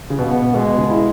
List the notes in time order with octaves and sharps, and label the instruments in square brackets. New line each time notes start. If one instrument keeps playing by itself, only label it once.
[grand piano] C#3
[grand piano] B2 [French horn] B3
[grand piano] B2
[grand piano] B2 [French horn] G#3
[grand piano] B2
C#3
E4